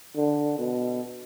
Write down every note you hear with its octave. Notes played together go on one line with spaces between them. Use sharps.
D3
B2